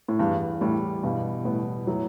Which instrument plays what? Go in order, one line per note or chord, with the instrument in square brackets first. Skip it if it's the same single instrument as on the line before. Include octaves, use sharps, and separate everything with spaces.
[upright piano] A2
[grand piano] E2 [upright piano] G2
[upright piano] A2 [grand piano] G3
[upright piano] G2 [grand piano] B2
[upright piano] A2 [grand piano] B3
[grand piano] A2 [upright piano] F#3